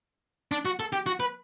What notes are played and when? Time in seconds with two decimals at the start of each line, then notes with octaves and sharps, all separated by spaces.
0.52 D4
0.65 F#4
0.80 A4
0.93 G4
1.06 F#4
1.20 B4